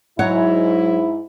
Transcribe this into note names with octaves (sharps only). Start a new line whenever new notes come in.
G#2 F#3 E4 C#5 F#5